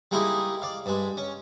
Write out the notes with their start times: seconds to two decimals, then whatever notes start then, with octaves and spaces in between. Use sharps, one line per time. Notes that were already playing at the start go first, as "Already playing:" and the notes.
0.11 G3 G#3 A#3 D#4 E4 G#4
0.62 D5 F5
0.86 G2 G#3
1.17 C#4